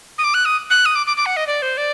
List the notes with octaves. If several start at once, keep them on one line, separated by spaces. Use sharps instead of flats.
D#6
D6
F#6
D#6
F#6
D#6
D6
D6
D6
F#5
D#5
D5
C5
D5